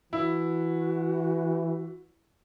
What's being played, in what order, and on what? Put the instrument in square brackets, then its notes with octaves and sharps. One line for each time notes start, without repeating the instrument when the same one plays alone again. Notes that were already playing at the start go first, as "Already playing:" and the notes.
[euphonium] E3 [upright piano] E4 [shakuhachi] F#4